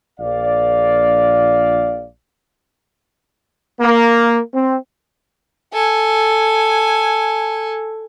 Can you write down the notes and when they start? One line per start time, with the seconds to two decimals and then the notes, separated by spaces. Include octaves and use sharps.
0.20 A#1 D5 F5
3.80 A#3
4.54 C4
5.73 A4 G#5